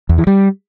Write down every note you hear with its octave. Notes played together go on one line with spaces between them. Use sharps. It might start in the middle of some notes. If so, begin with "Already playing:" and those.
E2
E3
G3